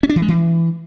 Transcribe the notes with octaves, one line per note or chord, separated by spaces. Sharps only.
C#4
D4
E3
G#3
E3